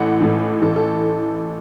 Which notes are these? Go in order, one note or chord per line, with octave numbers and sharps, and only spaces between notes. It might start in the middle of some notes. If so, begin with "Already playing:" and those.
Already playing: A1 A2 E3 F#5
A1 A2 E3
A1 A2 E3 A4
A4